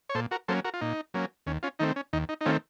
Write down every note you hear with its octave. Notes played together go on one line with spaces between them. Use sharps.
C#5
A#2 A4 C5
F#4 A#4
F#3 A#3 C#4 A4 C5
F#4 A#4
F4
A#2 D#4
F#3 A#3 C#4
D#2 C#4
C#4 F4
D#3 A3 C4 D#4
C#4
D#2 D#4
D#4
D#4
D#3 A3 C4 C#4 F4